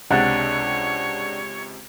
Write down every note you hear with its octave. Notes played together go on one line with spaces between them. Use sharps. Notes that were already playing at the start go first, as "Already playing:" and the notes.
C#2 C3 G#3 D4 C#5 F#5